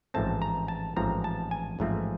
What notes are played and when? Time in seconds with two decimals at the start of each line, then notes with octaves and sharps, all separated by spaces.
0.14 A1 G#2 F3 A3 C4 A5
0.42 A#5
0.68 A5
0.96 A1 G#2 F3 A3 C4 A#5
1.24 A5
1.51 G#5
1.79 A1 G#2 F3 A3 C4